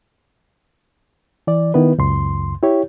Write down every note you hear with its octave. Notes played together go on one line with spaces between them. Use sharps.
E3 D5
D#3 B3 E4 B4
C#2 F#2 C6
E4 G4 C#5